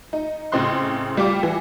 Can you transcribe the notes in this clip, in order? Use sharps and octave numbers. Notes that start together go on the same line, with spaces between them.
D#4
A2 C#3 C4 D#5 C6 F#6
G3 F4 G4 D6
E3